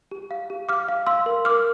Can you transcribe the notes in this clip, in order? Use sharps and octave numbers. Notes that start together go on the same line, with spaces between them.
G4
F5
G4
F5 D6 F6
F5
F5 C6 E6
A#4
A#4 D6 F6